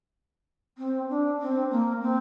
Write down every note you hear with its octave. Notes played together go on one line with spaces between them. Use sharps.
C4
D4
C4
A#3
C4